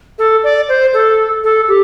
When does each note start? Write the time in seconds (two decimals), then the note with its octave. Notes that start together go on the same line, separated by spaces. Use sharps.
0.19 A4
0.44 D5
0.69 C5
0.94 A4
1.44 A4
1.68 G4